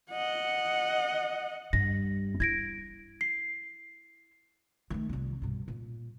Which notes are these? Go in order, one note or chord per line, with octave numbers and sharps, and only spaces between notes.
D#5 F#5
G2 A#6
E4 G#6 A#6 D7
C7
D#3 A3
C2 F3
G2 B2
A#2